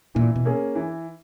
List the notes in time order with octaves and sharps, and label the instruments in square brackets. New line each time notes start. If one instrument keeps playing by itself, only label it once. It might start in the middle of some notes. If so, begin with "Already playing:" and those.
[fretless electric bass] A#2 [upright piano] E3
[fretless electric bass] B2
[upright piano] A#3 C#4 G#4
E3